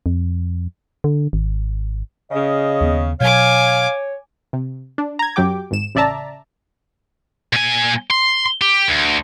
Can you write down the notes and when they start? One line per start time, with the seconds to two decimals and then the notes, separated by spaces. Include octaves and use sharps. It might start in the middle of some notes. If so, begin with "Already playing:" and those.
0.06 F2
1.04 D3
1.33 G#1
2.32 C#3 D#5
2.81 D#2 G#3 B3
3.21 B2 F#3 C#5 F5 G#5 D6
4.53 C3
4.98 D4
5.19 A#5 G#6
5.36 F#2 F#3 G4 G5 D6
5.71 G#1 G#2 E7
5.95 A1 C#3 D5 E5 A5 A#5
7.53 A#2 G#5
8.10 C6
8.61 G4
8.88 D2